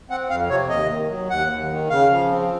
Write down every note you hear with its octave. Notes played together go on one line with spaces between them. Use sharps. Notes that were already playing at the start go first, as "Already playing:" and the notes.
C4 F#5
F2 F5
C3 C#5
D#2 D#5
D#3
F#3
D#2 F#5
D#2
D#3
C#3 F5
F3
C4